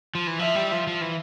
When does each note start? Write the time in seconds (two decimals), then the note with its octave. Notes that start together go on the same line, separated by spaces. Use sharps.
0.15 F3
0.27 E3
0.39 F3 E5
0.55 G3
0.72 F3
0.87 F3
1.01 E3